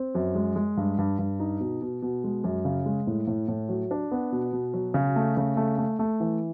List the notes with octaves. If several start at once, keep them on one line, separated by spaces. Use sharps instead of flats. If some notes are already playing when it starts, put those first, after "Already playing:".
Already playing: C4
F#2
G#3
G#3
G2
G2
G2
D#4
B2
B2
B2
G#3
F#2
C#3
G#3
A2
A2
A2
F#3
D4
B3
B2
B2
F#3
C#3
A3
C#3
A3
A3
A3
E3